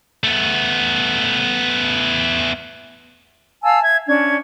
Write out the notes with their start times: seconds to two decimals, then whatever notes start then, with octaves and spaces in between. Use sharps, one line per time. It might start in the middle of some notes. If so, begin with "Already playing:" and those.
0.24 A3 B3
3.64 F5 G#5 A5 E6
3.82 E5 G#6
4.07 C#4 D4 G#6